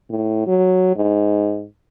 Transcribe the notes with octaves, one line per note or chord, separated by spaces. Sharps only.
A2
F#3
G#2